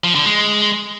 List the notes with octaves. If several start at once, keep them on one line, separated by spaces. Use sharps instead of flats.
F3
D3
G#3